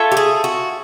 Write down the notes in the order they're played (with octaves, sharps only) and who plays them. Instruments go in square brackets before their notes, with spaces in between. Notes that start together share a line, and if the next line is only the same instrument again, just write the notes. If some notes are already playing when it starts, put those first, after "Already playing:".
Already playing: [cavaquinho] F4 A4 C#5 E5
[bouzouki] G4
G#4
F#4